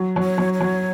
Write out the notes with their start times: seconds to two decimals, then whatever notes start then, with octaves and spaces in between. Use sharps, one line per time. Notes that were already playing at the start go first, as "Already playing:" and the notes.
Already playing: F#3
0.16 F#3
0.23 C#5
0.38 F#3
0.54 C#5
0.60 F#3